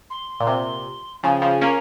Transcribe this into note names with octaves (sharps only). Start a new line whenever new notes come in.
C6
A#2
C3
C#3 F3 G#5
G5
C#3 F3
G#5
A#3 C#4 A#5